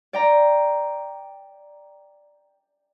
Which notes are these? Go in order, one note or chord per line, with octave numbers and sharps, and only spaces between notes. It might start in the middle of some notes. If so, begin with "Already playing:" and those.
D5 G5 A#5